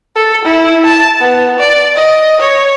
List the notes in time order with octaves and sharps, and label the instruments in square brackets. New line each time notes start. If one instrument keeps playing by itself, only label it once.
[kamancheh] A4
E4
A5
B3
D5
D#5
C#5